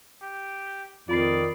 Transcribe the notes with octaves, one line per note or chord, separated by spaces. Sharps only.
G4
F2 D#3 F4 D5 B5 C7